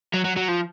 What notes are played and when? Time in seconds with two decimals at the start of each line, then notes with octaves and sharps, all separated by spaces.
0.14 F#3
0.25 F#3
0.37 F#3
0.49 F3